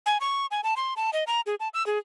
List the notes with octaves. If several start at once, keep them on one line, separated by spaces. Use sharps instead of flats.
G#5
C#6
G#5
A5
C6
A5
D#5
A#5
G#4
A5
E6
G#4